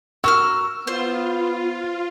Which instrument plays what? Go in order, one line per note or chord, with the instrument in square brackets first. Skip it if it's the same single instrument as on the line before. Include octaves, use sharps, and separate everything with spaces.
[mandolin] F#4 A#4 F6 [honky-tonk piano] E6
[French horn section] B3 [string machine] F4 [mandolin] C5